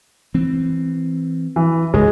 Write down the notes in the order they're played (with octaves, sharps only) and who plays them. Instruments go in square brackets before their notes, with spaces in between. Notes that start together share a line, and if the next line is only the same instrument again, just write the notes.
[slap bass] E3 C4
[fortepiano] E3
[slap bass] F#1 C#2 G#2 [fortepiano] G#3